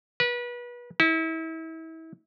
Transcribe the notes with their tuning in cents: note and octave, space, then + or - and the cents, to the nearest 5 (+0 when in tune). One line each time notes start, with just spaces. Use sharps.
B4 -30
E4 -35